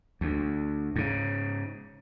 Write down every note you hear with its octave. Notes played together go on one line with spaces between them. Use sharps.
D2
G#2 C#3